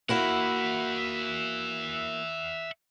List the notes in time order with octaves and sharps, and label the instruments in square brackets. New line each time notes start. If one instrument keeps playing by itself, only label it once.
[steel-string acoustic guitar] A#3 E4 F#4 [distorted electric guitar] E5 F#5